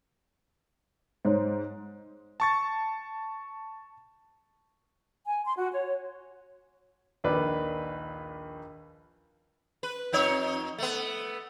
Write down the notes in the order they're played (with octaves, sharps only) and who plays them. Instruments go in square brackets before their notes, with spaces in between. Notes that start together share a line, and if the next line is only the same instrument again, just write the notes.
[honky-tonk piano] G#2 [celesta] C5 C#5
[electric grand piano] A5 C#6 A6
[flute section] G#5
C6
F#4
C#5
[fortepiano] A#1 D#2 B4 D5
[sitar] B4
F2 D#4 C#5
A3 B3